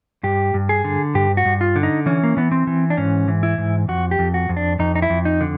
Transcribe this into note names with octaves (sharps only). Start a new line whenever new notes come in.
G2 G4
G2
G#4
D3
G2 G4
F#4
G2
F4
D3
D#4
E3 C#4
A#3
E3 B3
C4
E3
D4
G#2 C#4
E3
E4
G#2
F2 F#4
G4
F2
F#4
F2
D4
F2 D#4
D#4
E4
F2
D#4
D3